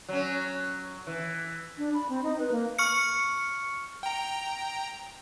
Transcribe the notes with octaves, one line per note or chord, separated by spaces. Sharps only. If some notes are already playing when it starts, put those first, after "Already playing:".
F#3 C#4
E3
D4
B5
C4
D#4
B4
A#3
C#6 F6 C#7
G5 A#5